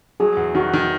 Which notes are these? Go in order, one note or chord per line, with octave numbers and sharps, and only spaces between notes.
F#3 G#4
E2
D#3 F#4
D#3